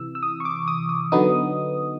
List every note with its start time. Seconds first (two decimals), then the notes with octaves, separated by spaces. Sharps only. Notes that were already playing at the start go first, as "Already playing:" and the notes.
Already playing: C3 E3 E6
0.15 E6
0.23 D#6
0.40 C#6
0.45 D6
0.68 D#6
0.89 D#6
1.12 D3 F#3 B3 D#4 D#6